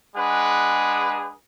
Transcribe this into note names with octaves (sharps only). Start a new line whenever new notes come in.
G#3 D4 G#4 B4 F#5